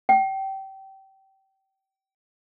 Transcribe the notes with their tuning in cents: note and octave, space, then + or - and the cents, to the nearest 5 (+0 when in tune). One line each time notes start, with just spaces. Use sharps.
G5 -25